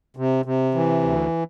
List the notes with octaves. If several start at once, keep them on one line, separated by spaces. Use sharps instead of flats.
C3
C3
E3
D2